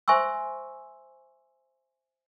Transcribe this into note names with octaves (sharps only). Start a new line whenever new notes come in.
C5 E5 G#5 C6 C#6 E6